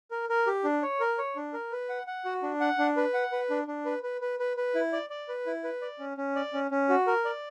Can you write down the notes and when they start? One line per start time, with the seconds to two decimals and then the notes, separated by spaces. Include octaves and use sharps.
0.11 A#4
0.29 A#4
0.47 G4
0.64 D4
0.82 C#5
1.00 A#4
1.18 C#5
1.36 D4
1.53 A#4
1.72 B4
1.89 F#5
2.07 F#5
2.25 F#4
2.43 D4
2.60 F#5
2.78 D4
2.97 B4
3.14 F#5
3.32 B4
3.50 D4
3.68 D4
3.85 B4
4.03 B4
4.21 B4
4.39 B4
4.57 B4
4.75 E4
4.92 D5
5.10 D5
5.28 B4
5.46 E4
5.64 B4
5.82 D5
5.99 C#4
6.17 C#4
6.36 D5
6.53 C#4
6.71 C#4
6.89 F#4
7.07 A#4
7.25 D5